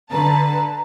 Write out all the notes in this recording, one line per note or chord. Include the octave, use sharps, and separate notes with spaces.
D3 B4 A5 A#5